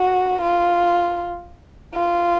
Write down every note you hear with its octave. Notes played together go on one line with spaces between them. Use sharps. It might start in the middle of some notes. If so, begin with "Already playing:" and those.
Already playing: F#4
F4
F4